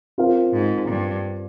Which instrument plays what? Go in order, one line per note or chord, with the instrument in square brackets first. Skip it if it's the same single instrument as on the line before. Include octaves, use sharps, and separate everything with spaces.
[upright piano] C4 F4 A#4 F5
[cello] G#2
G2